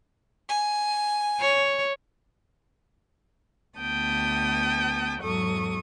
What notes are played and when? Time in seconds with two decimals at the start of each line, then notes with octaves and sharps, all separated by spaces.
0.49 G#5
1.40 C#5
3.77 D2 B3 G5 A5 D#6
5.21 E2 G#2 F#3 A4 C#6 D#6